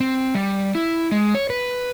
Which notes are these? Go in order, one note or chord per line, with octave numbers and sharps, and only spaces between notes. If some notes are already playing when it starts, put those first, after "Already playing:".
C4
G3
E4
G#3
C#5
B4